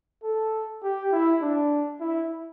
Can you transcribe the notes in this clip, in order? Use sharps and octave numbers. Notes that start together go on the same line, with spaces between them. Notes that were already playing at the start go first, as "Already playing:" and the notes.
A4
G4
E4
D4
E4